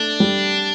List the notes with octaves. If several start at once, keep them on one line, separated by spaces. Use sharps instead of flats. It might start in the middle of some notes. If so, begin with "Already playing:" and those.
Already playing: A3 D4
G3